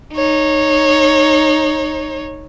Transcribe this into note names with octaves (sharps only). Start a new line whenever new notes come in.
D#4 C#5